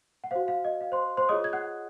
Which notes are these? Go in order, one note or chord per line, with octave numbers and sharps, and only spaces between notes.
F#5
F#4 C5 F5
F5
D#5
F5
C5 C6
C5 C6
F4 G#4 C#5 D#5 D#6
G#6
F#5 F#6